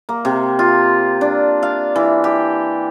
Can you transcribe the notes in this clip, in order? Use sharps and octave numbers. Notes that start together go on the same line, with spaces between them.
A#3
C3
F4
D4
F5
E3
G4